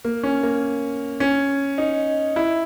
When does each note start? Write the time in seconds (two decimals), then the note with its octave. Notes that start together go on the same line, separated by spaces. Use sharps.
0.04 A#3
0.23 C#4
0.43 A#3
1.20 C#4
1.78 D#4
2.36 E4